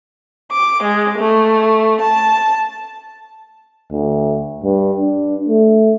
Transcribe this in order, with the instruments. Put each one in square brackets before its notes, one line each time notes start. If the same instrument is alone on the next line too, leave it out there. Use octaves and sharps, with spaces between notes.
[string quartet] D6
G#3
A3
A5
[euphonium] D2
G2
D4
A3